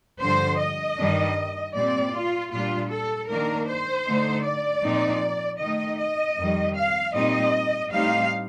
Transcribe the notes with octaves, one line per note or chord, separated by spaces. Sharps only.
G2 D3 F3 C5
D#5
G2 D#3 G3 D4
A#2 G3 C4 D5
F4
A#2 G3 D4 F4
A4
D#3 A#3 D4 A#4
C5
D3 A3 D#4
D5
A#2 F3 C4 D#4
D#3 A3 D#4 D#5
D#5
F2 D#3 G3
F5
A#2 G3 C4 D#4 D#5
A2 G3 C4 D#4 F5